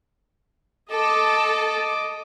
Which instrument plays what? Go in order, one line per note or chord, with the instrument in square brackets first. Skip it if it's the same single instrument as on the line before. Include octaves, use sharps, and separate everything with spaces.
[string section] A4 [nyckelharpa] D#5 D6